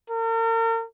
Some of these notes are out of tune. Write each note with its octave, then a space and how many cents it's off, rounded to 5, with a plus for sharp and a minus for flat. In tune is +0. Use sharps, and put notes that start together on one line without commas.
A#4 -40